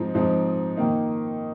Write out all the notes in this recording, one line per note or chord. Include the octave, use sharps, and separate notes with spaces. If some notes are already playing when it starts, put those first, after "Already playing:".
Already playing: G#2 F3 C4 D#4
G#2 F3 C4 D#4
D#3 A#3 D#4